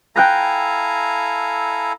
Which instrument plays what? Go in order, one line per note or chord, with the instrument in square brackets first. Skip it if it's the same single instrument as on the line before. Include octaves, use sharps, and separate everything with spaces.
[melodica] E4 A4 [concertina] F5 G#5 A#5 [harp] G5 F#6 A#6